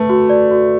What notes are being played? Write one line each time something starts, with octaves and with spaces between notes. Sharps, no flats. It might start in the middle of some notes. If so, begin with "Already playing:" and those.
Already playing: A3 B4
F#4
D5
F#4